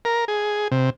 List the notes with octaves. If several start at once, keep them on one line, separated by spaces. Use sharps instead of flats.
A#4
G#4
C3